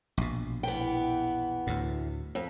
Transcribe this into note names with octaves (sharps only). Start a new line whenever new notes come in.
A#1 B2
E2 E3 B3 G5
D2 A2
F2